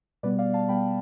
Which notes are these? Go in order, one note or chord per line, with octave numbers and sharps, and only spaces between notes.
B2 G3 B3 B4 D5
D5 F5
F5 A5
B2 G3 B3 G5 B5